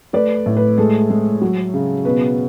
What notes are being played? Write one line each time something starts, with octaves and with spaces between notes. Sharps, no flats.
A3 B4 D5
A2
B4
G#3 A4
G#3
F#3
C#3
B2 B4